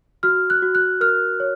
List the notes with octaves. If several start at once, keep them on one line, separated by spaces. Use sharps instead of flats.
F#4 F6
F#6
F#4
F#6
A#4 F6
C#5